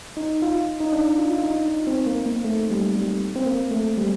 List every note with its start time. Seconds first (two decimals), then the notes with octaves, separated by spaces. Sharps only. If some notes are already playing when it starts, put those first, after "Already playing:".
0.17 D#4
0.42 F4
0.80 D#4
0.93 D4
1.18 F4
1.38 F4
1.44 D#4
1.68 D#4
1.87 C4
2.06 A#3
2.26 A#3
2.44 A3
2.70 G3
2.96 G3
3.36 C4
3.46 A#3
3.71 A3
3.97 G3